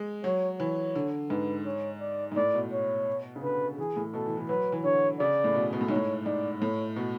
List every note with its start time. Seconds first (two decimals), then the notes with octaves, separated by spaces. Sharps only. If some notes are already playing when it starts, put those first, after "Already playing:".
Already playing: G#3
0.24 F#3 C#5
0.60 E3 C#5
0.95 D3
1.30 G#2 B4
1.66 C#5
2.01 D5
2.32 G#2
2.36 A2 D5
2.54 B2
2.72 C#5
3.36 C#3
3.42 D3 B4
3.78 E3 G#4
3.96 A2
4.13 B2 A4
4.26 E3
4.37 E3
4.49 F#3 B4
4.72 E3
4.84 D3 C#5
5.19 C#3 D5
5.44 A2
5.55 B2
5.73 B2
5.81 A2
5.89 G#2 C#5
5.96 A2
6.26 G#2 D5
6.62 A2 C#5
6.96 B2